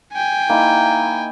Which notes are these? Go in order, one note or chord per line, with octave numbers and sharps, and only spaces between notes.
G5 G#5
A#3 D#4 E4